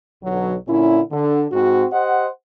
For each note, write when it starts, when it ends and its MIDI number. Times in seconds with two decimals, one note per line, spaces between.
0.24 0.56 35
0.24 0.56 47
0.24 0.56 50
0.24 0.56 54
0.68 1.01 46
0.68 1.01 50
0.68 1.01 61
0.68 1.01 64
1.12 1.47 50
1.52 1.86 44
1.52 1.86 60
1.52 1.86 66
1.93 2.28 67
1.93 2.28 72
1.93 2.28 75
1.93 2.28 78